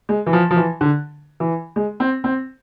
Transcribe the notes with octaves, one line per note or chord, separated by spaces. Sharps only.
G#3
E3
F3
F3
E3
D3
E3
G#3
C4
C4